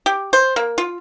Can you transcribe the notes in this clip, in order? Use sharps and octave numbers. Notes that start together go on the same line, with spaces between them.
G4
C5
A#3
F4